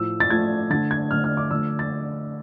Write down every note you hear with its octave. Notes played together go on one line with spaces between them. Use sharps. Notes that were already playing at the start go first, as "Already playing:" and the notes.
Already playing: A2 F3 A3 E6
A6
A2 F3 A3 G#6
D3 A3 A6
G#6
D3 A3 F6
F6
D6
D3 F3 A3 E6
A6